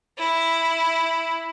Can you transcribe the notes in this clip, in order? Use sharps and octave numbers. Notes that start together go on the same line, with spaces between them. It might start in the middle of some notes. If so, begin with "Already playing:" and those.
E4